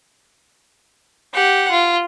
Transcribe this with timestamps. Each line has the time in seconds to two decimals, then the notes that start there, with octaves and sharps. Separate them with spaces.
1.34 G4 F#5
1.71 F4